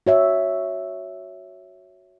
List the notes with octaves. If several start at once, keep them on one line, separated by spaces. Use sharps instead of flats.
F#4 C#5 E5